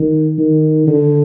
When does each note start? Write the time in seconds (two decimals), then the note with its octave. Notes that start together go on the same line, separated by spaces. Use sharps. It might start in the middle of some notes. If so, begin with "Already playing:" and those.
Already playing: D#3
0.38 D#3
0.87 D3